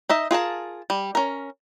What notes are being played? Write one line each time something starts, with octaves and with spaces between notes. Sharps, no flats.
D#4 D#5 E5
F4 G#4 A#4 A5
G3
C#4 A#4